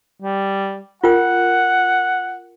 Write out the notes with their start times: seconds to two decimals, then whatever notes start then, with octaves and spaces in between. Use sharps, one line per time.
0.22 G3
1.04 F4 A#4 F#5 G5